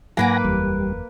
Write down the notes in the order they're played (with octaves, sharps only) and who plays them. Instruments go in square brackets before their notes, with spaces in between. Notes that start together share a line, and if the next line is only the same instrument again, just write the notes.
[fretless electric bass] G#2 F#3 [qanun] A#3 B4 D6 [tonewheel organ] F#5 G#5 A#6
[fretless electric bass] F#1 E2 [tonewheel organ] G3